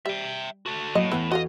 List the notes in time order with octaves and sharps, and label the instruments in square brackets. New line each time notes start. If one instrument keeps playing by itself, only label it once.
[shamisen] G3 [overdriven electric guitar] E5 G5
[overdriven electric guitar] F#4 A4
[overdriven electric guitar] A2 [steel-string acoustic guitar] F#3 A#3 F#4 [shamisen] D#5
[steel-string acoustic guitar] E2 E3 G5 [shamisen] B3 E4 B4
[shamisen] F#4 A4 F5 [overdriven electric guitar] D#5